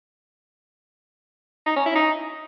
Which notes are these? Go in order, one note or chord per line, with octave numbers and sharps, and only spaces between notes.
D#4
C#4
E4
D#4